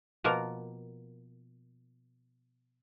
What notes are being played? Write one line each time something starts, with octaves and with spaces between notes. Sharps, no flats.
B2 F3 A#3 A#4